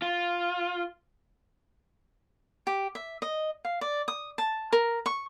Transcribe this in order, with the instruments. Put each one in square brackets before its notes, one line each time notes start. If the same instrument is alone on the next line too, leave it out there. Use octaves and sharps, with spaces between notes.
[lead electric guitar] F4
[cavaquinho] G4
E5
D#5
F5
D5
D#6
A5
A#4
C#6